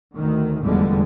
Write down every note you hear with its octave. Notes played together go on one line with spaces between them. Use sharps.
D2 D#3
F1 E2 D3 G3 G#3